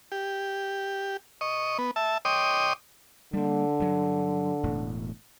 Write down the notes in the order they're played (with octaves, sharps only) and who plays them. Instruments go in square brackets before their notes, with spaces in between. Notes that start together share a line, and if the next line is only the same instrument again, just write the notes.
[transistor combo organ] G4
D#5 C#6
B3
E5 A5
C#5 D#5 G5 C6 D6 D#6
[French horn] D3 [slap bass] G3 A#3
[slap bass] G2 F#3
E1 A2